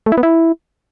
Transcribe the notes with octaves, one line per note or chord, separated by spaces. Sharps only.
A3
E4
B3
E4